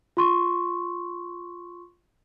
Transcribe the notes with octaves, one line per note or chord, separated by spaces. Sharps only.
F4 C6 C#6